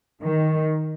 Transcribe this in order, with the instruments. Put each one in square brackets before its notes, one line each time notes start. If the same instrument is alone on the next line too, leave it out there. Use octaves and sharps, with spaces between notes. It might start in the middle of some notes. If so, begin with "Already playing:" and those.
[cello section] D#3